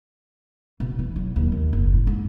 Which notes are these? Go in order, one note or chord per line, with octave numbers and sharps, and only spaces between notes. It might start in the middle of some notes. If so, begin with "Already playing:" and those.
B2
E3
F#3
D#2
D#2
F#1
A2
G#2